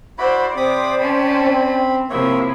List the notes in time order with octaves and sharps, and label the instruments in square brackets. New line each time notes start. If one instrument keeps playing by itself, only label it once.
[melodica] E4 F#4 B5 [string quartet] C5 D5
[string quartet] C3 [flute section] C5 D5 G5 [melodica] B5 D6 D#6
[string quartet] C#4 A5 [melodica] B5
[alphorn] C4
[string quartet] C3 F3 E4 [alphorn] A#3 [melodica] C#5 E5